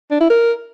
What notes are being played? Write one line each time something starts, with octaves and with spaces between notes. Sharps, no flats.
D4
E4
A#4